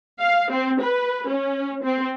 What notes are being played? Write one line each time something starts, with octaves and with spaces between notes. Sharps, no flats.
F5
C4
B4
C#4
C4